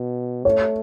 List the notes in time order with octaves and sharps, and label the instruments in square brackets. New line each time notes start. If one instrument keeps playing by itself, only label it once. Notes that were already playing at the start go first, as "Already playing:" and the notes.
Already playing: [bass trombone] B2
[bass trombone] A3 [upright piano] C#5